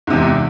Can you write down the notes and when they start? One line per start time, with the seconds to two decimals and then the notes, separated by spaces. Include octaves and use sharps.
0.07 G#2
0.10 C3
0.13 E2